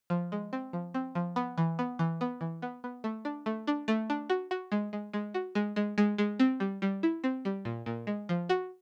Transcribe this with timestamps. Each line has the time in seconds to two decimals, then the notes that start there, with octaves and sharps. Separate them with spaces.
0.10 F3
0.32 G#3
0.53 C4
0.73 F3
0.94 C4
1.15 F3
1.36 B3
1.58 E3
1.79 B3
1.99 E3
2.21 B3
2.41 E3
2.62 B3
2.84 B3
3.04 A3
3.25 D4
3.46 A3
3.67 D4
3.88 A3
4.10 D4
4.30 F#4
4.51 F#4
4.72 G#3
4.93 G#3
5.14 G#3
5.34 F#4
5.55 G#3
5.76 G#3
5.98 G#3
6.18 G#3
6.40 C4
6.60 G3
6.82 G3
7.03 E4
7.24 C4
7.45 G3
7.65 A#2
7.86 A#2
8.07 G#3
8.29 F3
8.49 F#4